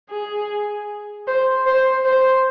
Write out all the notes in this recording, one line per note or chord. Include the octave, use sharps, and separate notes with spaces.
G#4
C5
C5
C5